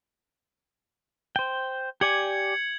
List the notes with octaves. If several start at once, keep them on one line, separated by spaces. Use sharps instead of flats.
C5 G5
G4 D5 G#5 G#6 C#7 F#7